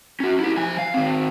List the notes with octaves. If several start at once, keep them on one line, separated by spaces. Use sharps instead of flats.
C#4 F#4
E4 G4
F3 G#5
F5
D#3 C4